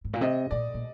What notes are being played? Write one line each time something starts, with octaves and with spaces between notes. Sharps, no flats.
G#2
A#2
C3 D#5
A#2 D5
A#2